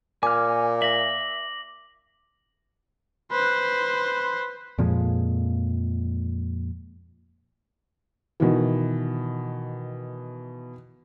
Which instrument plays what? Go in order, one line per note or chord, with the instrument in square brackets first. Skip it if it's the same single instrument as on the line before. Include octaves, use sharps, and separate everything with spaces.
[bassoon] A#2 [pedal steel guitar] G#5 F6 [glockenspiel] D6
[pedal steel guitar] E5 [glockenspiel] A#6 F#7
[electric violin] B4 C5
[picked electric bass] F2 A#2 F3 G#3
[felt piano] B2 D#3 E3